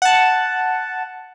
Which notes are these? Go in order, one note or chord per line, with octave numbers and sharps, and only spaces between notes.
F#5 A5